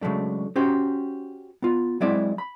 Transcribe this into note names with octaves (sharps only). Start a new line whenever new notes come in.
C#3 F#3 G#3 A3 D4
C#4 F#4 G4 C5
B3 F4
F#3 G#3 C4 E4 D5 E5
B5